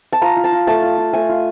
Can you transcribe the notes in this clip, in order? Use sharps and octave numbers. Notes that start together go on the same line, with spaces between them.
A5
F4 A#5
F4
A5
F4
A3 A5
F4
F4
A3 G#5
F4